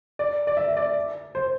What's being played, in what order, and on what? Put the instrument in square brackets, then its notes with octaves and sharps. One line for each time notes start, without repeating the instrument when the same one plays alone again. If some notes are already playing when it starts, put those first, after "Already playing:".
[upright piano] D5
D5
E5
D5
C5